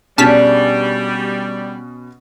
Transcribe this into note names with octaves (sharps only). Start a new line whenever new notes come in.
B2 G3 C#4 D4 G#4 A5 F6 B6